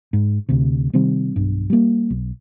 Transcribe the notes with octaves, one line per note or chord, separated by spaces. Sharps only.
G#2
D2 C3
C3 D#3 G3 C4
B1 G2
G3 A#3
B1